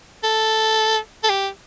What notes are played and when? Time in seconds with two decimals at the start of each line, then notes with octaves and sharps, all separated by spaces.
0.24 A4
1.24 A4
1.29 G4